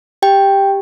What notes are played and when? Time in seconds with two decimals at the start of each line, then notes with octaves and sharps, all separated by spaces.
0.22 G4 G5